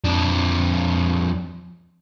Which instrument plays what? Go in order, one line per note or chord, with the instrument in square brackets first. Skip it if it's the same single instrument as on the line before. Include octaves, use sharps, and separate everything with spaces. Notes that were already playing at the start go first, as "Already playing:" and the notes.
[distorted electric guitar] F2 D4